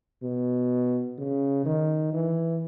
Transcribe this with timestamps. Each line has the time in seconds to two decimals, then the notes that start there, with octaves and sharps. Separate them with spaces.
0.23 B2
1.18 C#3
1.65 D#3
2.13 E3